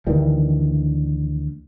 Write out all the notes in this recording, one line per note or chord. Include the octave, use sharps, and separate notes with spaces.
D2 D#3 E3 G3